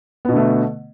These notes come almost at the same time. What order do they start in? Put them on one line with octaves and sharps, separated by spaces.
B3 B2 D3 A3